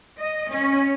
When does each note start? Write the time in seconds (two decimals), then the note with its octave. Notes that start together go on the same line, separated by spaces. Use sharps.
0.18 D#5
0.50 C#4